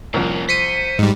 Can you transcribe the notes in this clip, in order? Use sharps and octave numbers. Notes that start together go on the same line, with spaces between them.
C2 F2 F3 A#3 C#4
C5 B6 C#7 D#7
G#2 G3